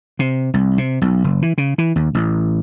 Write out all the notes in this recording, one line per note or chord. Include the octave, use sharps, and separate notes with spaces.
C3
C2
C3
B1
F#1
E3
C#3
E3
D#2
A1